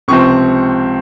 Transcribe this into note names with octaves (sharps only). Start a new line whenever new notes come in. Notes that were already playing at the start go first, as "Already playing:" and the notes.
C#2 C3 F3 C4 C#6